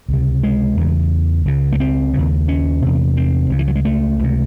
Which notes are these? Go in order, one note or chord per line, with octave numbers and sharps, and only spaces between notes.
C#2 C3
G#3
E2 C#3
C#2 C#3
A3
C4
D#2 C#3
C#4
E2 C3
C4
C#2 C#3
E3
F#3
G#3
A3
C#2 C3